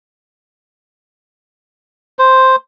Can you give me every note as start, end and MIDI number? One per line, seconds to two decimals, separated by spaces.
2.19 2.56 72